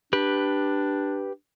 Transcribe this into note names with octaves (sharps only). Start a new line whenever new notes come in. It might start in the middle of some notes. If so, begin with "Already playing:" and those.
D4 G4 B4